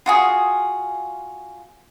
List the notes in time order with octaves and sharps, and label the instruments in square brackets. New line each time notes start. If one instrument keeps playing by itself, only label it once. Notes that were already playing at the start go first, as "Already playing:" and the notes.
[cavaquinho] F4 F#4 G#4